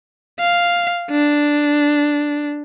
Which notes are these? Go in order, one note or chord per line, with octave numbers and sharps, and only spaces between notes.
F5
D4